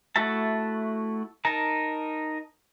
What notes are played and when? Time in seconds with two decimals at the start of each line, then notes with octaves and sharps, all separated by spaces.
0.16 A3 E4 F#4 E5 A5
1.45 D#4 A#4 A5